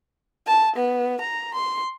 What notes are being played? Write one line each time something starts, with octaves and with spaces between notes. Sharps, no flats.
A5
B3
A#5
C6